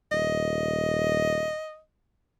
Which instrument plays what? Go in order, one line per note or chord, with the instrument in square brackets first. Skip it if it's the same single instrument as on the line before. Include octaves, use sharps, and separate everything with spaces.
[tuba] D#1 [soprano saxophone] D#5